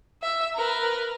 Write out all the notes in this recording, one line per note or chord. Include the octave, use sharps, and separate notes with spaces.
E5
A#4 B4